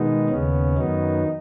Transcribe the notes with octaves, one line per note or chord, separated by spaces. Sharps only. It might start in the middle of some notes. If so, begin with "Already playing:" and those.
Already playing: B2 D#3 G#3 B3 D#4
D#2 C#3 B3 C#4
F#2 D#3 F#3 B3 D#4